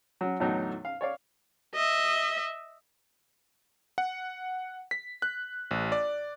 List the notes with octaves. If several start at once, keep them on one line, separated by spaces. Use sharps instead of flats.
F#3 C#4
E2 A2 D3 F#3 D#4
F5
C#5 D5 F5
D#5 E5
F#5
B6
F#6
A1
D5